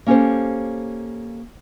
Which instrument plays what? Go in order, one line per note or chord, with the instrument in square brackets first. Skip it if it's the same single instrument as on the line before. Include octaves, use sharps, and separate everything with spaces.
[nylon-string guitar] A#3 C#4 G4 A4 C5